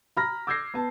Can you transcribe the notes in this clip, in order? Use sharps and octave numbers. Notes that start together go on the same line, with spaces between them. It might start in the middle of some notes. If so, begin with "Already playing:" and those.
A#5 B5 F6 A#6
D6 E6 G6 G#6 A#6 C7
B3 A5